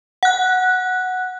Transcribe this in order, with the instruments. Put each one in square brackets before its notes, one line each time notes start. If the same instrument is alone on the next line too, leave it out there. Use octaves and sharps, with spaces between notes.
[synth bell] F#5 F#6